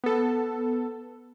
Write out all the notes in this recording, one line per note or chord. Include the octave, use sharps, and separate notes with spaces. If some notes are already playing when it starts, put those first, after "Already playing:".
B3 A4